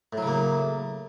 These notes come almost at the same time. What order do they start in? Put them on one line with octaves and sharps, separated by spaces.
A2 F#3 C#3 A#3